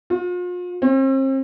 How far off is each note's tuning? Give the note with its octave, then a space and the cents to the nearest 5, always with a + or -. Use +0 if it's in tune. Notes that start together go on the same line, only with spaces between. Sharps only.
F4 +40
C4 +40